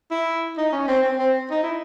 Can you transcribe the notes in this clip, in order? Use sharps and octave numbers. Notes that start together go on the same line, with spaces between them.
E4
D#4
C#4
C4
C4
C4
D#4
E4